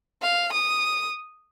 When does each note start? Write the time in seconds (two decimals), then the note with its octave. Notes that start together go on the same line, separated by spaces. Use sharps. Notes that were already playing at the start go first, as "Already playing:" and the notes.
0.22 F5
0.53 D#6